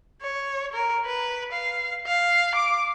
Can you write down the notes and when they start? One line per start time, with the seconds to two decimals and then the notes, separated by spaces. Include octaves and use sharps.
0.22 C#5
0.73 A#4
1.05 B4
1.52 F5
2.06 F5
2.55 D6